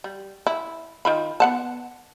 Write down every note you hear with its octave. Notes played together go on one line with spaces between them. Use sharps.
G3
E4
D#3 F4 B5
B3 F#5 A5